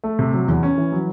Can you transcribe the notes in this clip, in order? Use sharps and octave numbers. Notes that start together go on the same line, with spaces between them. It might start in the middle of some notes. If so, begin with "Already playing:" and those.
A3
C3
F#3
E2
C#4
E3
F#3